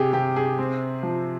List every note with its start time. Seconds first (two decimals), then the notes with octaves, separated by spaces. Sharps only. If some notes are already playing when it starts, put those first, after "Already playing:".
Already playing: C3 G4 G#4
0.13 C3 G4
0.36 G#4
0.59 C4
1.03 F3